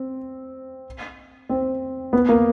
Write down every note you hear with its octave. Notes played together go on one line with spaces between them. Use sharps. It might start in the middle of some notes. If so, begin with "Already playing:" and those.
Already playing: C4
C4
B3
A#3